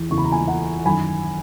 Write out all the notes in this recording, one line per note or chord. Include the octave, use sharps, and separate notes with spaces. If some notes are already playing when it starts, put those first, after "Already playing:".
Already playing: E2 E3
E2 C#3 E3 C#6
B5
A#5
G#5 B5
F#5 A#5
F#2 D#3 G#5 B5